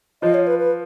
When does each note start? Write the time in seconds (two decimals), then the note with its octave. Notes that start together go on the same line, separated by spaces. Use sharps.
0.22 F3 F4 D#5
0.34 C#5
0.47 B4
0.59 B4